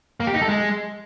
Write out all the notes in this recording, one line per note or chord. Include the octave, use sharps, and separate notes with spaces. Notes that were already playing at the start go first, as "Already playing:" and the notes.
A#3
G4
D#4
A4
G#3